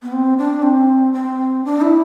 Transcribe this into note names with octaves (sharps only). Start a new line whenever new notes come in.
B3
C4
D4
C4
C4
D4
E4